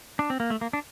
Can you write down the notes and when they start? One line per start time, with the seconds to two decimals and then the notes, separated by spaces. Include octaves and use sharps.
0.19 D4
0.30 C4
0.40 A#3
0.50 A3
0.61 A#3
0.73 D4